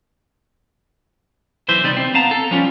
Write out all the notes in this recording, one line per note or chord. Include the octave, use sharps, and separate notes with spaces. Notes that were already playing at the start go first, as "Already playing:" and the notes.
B1 E3 C5 E5
C3 G3 D#4 D5
C4
B3 F5 A5 A#5
A4
F3 G3 C#4 F4